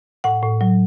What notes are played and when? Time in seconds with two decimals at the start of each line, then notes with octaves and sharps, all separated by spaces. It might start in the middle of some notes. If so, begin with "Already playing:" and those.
0.24 A2 F#5
0.42 A2
0.61 F#3